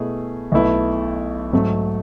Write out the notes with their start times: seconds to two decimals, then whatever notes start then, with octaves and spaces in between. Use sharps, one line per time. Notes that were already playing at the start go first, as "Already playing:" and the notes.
Already playing: B2 A3 E4 G#4
0.52 B1 B2 A3 E4 B4
1.53 G#2 F#3 A3